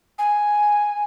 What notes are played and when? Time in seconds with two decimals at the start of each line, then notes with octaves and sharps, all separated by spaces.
0.18 G#5